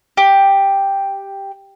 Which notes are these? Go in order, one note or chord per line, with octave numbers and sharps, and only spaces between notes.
G4